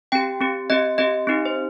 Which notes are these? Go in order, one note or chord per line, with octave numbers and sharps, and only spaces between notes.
C4 G4 G5
C4 G4
C4 G4 D#5
C4 G4 D#5
C4 D#4 G4
C5